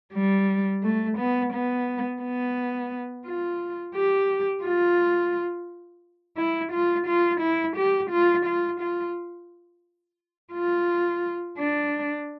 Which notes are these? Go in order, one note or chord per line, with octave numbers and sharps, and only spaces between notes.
G3
A3
B3
B3
B3
F4
G4
F4
E4
F4
F4
E4
G4
F4
F4
F4
F4
D4